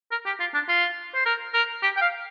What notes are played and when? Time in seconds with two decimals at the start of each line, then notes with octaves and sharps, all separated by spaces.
0.11 A#4
0.26 G4
0.40 F4
0.54 D4
0.68 F4
1.15 C5
1.25 A#4
1.54 A#4
1.82 G4
1.97 G5
2.01 F5